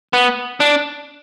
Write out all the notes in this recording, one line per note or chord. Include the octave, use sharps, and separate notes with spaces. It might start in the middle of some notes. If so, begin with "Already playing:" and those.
B3
D4